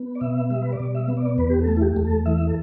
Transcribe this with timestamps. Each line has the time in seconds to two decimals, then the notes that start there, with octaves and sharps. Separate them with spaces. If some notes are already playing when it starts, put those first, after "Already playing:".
Already playing: B3
0.15 D5
0.21 B2 E5
0.50 G3 E5
0.62 B4
0.73 D5
0.80 B2
0.95 E5
1.08 B3
1.17 D5
1.38 E2 B4
1.50 G4
1.61 A4
1.68 A3
1.77 E4
1.82 G4
1.96 E2
2.04 A4
2.26 E3 E5
2.47 A4